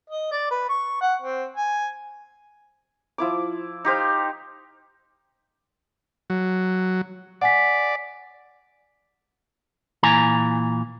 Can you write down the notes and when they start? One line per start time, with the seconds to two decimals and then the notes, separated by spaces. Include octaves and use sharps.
0.10 D#5
0.32 D5
0.51 B4
0.69 C#6
1.02 F#5
1.22 C4
1.56 G#5
3.18 F3 E4 D6
3.85 D#4 G4 C5 F5
6.30 F#3
7.41 D5 F#5 G#5 B6
10.03 A#2 E3 G#5 A#5